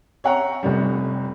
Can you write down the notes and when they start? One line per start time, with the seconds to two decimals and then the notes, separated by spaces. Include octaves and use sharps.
0.24 C#5 E5 F#5 G5 A#5 C#6
0.63 F1 F2 G3